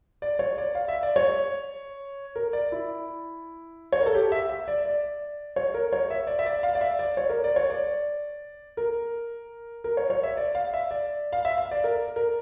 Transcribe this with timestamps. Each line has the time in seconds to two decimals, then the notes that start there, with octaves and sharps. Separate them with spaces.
0.22 D5
0.39 C#5
0.58 D5
0.75 F5
0.88 E5
1.03 D5
1.16 C#5
2.36 A#4
2.53 D5
2.72 E4
3.92 C#5
4.00 A#4
4.06 A4
4.14 G4
4.32 E5
4.49 E5
4.68 D5
4.85 D5
5.56 C#5
5.74 A#4
5.92 C#5
6.10 E5
6.27 D5
6.39 E5
6.46 D5
6.63 F5
6.75 D5
6.81 E5
6.99 D5
7.17 C#5
7.29 A#4
7.44 D5
7.56 C#5
7.70 D5
8.77 A#4
9.84 A#4
9.97 C#5
10.10 C#5
10.23 E5
10.37 D5
10.55 F5
10.73 E5
10.91 D5
11.33 F5
11.45 E5
11.57 F5
11.71 D5
11.84 A#4
12.16 A#4